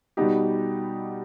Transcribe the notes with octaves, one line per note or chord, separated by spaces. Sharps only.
B2 G3 B3 D#4 G4